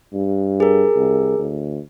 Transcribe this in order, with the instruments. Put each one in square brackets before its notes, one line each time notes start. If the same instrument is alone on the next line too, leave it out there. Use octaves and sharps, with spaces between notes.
[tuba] G2
[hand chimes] G#4 A#4
[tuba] C2
D2